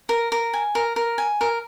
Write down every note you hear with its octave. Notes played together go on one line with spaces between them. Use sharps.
A#4
A#4
G#5
A#4
A#4
G#5
A#4